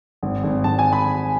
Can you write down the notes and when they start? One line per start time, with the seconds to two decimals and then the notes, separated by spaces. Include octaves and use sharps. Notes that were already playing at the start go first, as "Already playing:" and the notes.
0.23 G#1
0.44 G#1
0.64 G#1 A5
0.79 G#5
0.93 B5